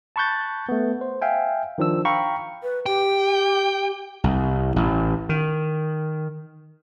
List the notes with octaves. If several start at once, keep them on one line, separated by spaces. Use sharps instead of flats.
A5 B5 C#6 F#6 G6 A6
A3 B3
C5
E5 F5 G5 G#5
D#3 F3 D4 E6
F5 G5 A#5 B5 C#6
B4
G4 G5
C2
A1
D#3